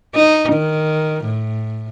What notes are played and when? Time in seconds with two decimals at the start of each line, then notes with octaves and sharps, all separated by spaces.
0.15 D#4
0.53 D#3
1.24 A2